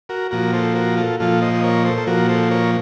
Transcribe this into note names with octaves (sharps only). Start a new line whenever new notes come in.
F#4 A#4
A#2 F3 F#4 A#4
A4 C5
F#4 A#4
F4 A4
A#2 F3 F4 A4
C5 D#5
D#5
A#4 C#5
A4 C5
A4
A#2 F3 F#4 A#4
A4 C5
A#4 C#5